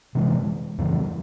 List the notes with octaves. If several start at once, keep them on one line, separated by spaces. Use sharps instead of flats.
C3 E3 G#3
F2 C#3 E3 G3